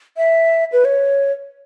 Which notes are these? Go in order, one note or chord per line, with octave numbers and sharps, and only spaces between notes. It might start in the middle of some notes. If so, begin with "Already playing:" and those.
E5
B4
C#5